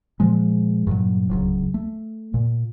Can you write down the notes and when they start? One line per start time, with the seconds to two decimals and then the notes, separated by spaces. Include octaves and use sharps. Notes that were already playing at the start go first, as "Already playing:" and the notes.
0.20 A#2 F3 G#3
0.87 G2 A#2 F#3
1.29 D1 C#2 F#3
1.74 A3
2.34 A#2